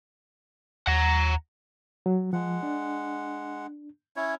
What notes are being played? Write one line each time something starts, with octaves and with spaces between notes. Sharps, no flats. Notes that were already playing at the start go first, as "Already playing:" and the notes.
D#2 F#5 A#5
F#3
F3 G#3 F#5
D4
C#4 E4 C#5